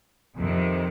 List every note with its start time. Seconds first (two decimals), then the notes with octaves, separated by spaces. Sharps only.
0.37 F2 C3 D#3